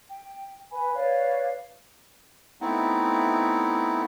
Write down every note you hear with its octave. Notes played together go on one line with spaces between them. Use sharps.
G5
B4 G#5 B5
B4 C#5 D5 F5
A3 B3 C4 D#4 E4